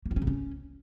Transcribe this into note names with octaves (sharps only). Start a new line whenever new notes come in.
A#3
E4
C#4
C#3
C#4